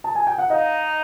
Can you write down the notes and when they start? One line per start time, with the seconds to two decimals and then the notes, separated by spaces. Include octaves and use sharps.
0.04 A5
0.15 G#5
0.27 G5
0.38 F#5
0.50 D#4 D#5 F5